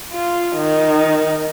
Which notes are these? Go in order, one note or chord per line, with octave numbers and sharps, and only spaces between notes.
F4
D#3